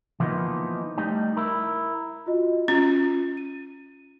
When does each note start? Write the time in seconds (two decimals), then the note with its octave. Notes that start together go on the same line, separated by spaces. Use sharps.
0.20 E3 F3 A#3 B3 D#4
0.98 G3 A3 D#4
1.37 E4 A#4
2.26 F4 F#4 D#5
2.68 C#4 F4
3.37 D#7